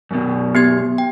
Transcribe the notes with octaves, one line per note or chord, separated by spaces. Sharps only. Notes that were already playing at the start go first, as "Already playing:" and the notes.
F#2 B2
B3 G4 G#6
G5